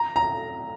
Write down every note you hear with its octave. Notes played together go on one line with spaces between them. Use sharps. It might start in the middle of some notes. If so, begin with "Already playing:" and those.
Already playing: A#5
A#5